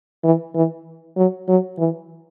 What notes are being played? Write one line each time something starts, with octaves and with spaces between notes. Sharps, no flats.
E3
E3
F#3
F#3
E3